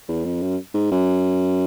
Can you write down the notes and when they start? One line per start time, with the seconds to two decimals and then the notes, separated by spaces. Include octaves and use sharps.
0.08 E2
0.25 F2
0.42 F#2
0.74 G#2
0.91 F#2